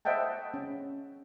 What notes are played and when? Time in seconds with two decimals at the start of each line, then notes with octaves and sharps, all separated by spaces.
0.05 C5 D#5 E5 F#5 G5 A5
0.54 C#4